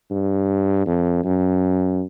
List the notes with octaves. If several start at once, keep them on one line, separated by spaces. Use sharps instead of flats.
G2
F2
F#2